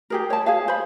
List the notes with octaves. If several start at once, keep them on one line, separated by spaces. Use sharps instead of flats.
G4 G#4 A#4
C#5 A5
G#4 C#5 F5
C5 B5